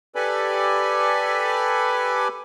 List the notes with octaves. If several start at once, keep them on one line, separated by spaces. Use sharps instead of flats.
G4 A4 B4 D5 G#5 B5